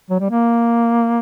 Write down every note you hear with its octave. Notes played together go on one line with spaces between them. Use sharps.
F#3
G3
A#3